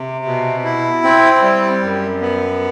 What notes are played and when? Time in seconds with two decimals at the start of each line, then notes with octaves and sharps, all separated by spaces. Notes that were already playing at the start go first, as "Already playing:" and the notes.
Already playing: C3
0.25 B2
0.64 E4
1.04 C4
1.42 G3
1.82 F#2
2.21 B3